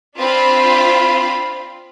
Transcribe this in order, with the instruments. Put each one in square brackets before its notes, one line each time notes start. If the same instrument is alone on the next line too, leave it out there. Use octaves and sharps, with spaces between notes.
[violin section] C4 D4 F4 F5 B5